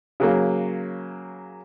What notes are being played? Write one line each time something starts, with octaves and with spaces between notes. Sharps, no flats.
C#3 F#3 A#3